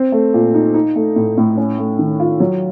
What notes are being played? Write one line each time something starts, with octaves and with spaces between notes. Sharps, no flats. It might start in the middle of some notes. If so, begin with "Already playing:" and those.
Already playing: C4
A3
A#2
D#4
D#4
A3
A2
A2
C#4
A3
D#3
F4
F#3